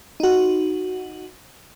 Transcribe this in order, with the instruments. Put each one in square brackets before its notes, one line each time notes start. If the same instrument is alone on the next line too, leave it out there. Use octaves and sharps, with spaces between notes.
[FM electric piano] D#4 F#4